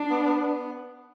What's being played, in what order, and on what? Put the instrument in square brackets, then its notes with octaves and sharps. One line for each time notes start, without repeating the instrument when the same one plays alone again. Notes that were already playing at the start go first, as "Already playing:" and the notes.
Already playing: [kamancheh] D4
[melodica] B3
B3
B3